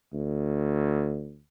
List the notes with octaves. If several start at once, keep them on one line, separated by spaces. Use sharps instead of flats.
D2